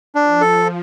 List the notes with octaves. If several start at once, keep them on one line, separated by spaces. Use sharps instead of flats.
F3 D4
A4